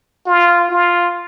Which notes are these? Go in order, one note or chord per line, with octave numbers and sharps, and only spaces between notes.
F4
F4